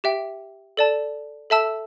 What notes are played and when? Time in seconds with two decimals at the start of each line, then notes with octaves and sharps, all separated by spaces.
0.04 G4 E5 G5
0.77 A4 D5 A5
1.50 A4 E5 A5 E6